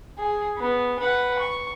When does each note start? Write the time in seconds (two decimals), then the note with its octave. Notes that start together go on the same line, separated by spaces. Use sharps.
0.18 G#4
0.58 B3
0.99 B4 F#5
1.39 C#6